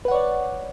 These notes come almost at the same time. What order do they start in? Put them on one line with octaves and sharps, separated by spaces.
B4 F#5 C#5 D5